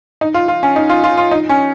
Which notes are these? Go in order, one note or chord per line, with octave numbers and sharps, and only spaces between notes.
D#4
F4
F4
C#4
D#4
F4
F4
F4
D#4
C#4